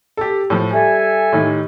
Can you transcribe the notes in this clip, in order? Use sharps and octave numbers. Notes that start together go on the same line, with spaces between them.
G4 A4
A2 F3
G3 A4 E5 G#5
A2 D#3 G4